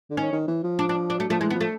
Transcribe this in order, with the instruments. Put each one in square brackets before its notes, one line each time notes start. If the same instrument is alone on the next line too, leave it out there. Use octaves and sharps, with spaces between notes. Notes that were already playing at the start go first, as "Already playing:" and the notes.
[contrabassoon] D3
[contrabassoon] D#3 [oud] C#4
[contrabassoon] D#3
E3
F3
[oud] D4
D4
D4
[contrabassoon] F#3 [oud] A3
[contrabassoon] F3 [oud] A3
[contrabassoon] E3 [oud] G#3
[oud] B3
[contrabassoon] F3
[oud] A3